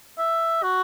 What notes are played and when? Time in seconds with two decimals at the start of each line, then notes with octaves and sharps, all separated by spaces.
0.18 E5
0.63 F#4